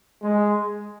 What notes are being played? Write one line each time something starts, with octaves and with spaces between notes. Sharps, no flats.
G#3